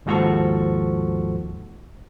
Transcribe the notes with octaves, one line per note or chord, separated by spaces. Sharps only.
D#2 G#2 F3 F#4 A4 C#6